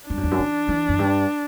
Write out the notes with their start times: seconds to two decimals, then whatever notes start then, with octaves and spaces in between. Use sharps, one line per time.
0.09 G2 D4
0.17 F#2
0.24 E2
0.31 F#2
0.39 E3
0.69 E3
0.89 F#2
0.99 G2